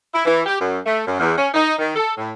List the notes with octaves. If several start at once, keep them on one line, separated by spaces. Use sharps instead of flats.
E4
E3
G4
F#2
A3
F#2
E2
C#4
D#4
D#3
A4
A2